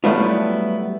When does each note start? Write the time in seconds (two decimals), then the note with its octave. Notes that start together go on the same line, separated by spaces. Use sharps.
0.04 F#3 G3 A3 B3 E4 F4